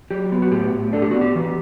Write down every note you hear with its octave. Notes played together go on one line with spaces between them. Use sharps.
F#3 G4
B3
F#4
A2 G4
A2
D4 A4
G4
B3 F#4
G4
E3